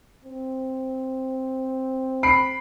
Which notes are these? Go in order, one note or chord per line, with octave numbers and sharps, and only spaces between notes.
C4
B5 C7 D7